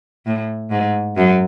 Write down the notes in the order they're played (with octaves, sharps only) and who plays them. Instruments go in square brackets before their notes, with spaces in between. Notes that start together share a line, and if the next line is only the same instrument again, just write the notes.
[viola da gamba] A2
G#2
F#2